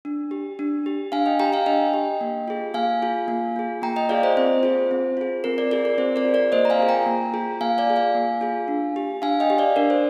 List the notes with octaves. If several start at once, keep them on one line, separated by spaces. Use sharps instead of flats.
D4
G4
D4
G4
D4 F5 G#5
D#5 G5
G4 G5 A#5
F5 G#5
D4 D#5 G5
G4
A#3
F4 G#4
A#3 F5 G#5
F4 G#4
A#3
F4 G#4
A#3 G5 A#5
D#5 G5
F4 G#4 D5 F5
C5 D#5
C4 C5
F4 G#4
C4
F4 G#4
C4 A#4
A#4 D5
F4 G#4 A#4 D5
A#4
C4 C5
A#4 D5
F4 G#4
A#4 D5
A#3 C5 D#5
A#5
F5 G#5
F4 G#4
G5 A#5
A#3
F4 G#4
A#3 F5 G#5
D5 F5
F4 G#4
F5 G#5
A#3
F4 G#4
D4
G4
D4 F5 G#5
D#5 G5
G4
D5 F5
D4 A#4 D5
C5